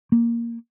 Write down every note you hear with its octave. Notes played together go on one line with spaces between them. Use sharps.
A#3